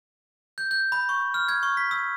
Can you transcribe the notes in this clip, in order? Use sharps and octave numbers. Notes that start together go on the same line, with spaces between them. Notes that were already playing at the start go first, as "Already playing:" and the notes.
G6
G6
B5
C#6
F6
G#6
C#6
B6
E6